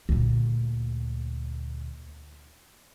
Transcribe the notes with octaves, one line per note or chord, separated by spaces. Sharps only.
D2 A#2